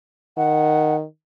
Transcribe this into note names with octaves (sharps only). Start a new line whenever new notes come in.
D#3 F#5